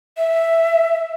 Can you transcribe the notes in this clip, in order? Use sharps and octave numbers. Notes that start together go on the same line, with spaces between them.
E5